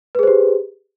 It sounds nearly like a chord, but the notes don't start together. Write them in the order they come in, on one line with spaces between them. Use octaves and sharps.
B4 G#4 C5 G4